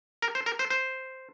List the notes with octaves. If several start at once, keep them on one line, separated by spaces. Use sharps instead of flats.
A#4
C5
A#4
C5
C5